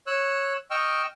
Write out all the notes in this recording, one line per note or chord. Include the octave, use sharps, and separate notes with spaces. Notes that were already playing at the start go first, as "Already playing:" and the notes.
C#5 E6 F#6
D#5 G5 C#6 E6 F6